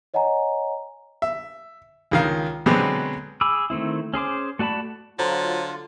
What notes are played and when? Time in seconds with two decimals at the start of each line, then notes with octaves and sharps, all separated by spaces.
0.14 C#5 D#5 F#5 G#5 A#5
1.22 E5
2.11 C#2 D#3 F5
2.66 B2 D3 F#3 G#3 B3 C4
3.41 G#4 B5 D6 E6
3.70 D#3 A3 C4 E4
4.14 C#4 G#4 C5 D6
4.59 A3 F#4 D5 A5 B5
5.19 D3 F#3 F4 C5 A#5